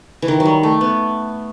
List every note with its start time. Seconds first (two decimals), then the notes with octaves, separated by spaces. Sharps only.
0.22 E3
0.28 D#3
0.40 F#3
0.46 G3
0.63 A3
0.81 B3